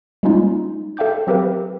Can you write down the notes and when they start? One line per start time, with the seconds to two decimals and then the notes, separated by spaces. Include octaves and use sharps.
0.23 G3 G#3 A#3 C#4 D#4 F4
0.97 A4 E5 F5 G5 D6 G6
1.27 F#3 C4 G4 A#4 B4 F5